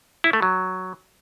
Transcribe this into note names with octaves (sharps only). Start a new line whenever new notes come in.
E4
A3
F#3